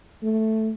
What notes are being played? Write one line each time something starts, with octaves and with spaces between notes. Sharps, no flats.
A3